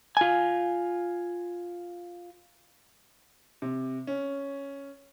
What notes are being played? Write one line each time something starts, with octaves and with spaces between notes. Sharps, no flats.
F4 G#5
C3
C#4